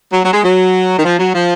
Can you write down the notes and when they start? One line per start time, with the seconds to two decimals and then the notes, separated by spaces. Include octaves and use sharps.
0.13 F#3
0.24 F#3
0.33 G#3
0.43 F#3
0.99 D#3
1.05 F3
1.19 F#3
1.34 F3